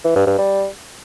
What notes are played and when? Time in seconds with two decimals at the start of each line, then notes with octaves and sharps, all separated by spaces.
0.04 E3
0.16 G2
0.27 G2
0.38 G3